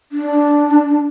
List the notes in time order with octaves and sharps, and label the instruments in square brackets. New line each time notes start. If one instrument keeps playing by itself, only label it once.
[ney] D4